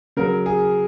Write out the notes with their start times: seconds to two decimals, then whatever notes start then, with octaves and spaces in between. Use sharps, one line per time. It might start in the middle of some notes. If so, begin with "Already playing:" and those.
0.17 C#3 F#3 A#4
0.46 G#4